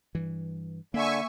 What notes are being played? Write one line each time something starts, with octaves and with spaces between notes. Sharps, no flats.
G2 E3
D3 A#3 E5 G#5 C#6